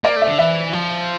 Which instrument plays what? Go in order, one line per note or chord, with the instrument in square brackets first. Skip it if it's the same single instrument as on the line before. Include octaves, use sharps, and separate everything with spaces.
[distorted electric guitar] A#3 [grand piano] D5
[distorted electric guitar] A3
[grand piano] E5
[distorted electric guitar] D3
[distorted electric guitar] E3 [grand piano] E5
[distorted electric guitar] F3